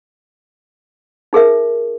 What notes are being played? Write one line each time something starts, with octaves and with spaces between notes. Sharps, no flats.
D#4 G#4 A#4 E5